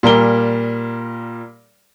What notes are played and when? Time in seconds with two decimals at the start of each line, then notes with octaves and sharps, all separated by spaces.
0.03 A#2 G3 A#4 G7